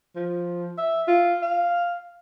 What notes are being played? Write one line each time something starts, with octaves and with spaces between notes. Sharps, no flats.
F3
E5
F4
F5